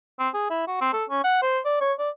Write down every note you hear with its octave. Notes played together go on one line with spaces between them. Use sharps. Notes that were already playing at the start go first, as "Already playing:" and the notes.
C4
G#4
E4
F#4
C4
A4
C#4
F#5
C5
D5
C#5
D5